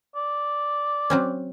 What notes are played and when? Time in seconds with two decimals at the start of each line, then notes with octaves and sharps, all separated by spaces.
0.16 D5
1.10 F#3 C4 C#4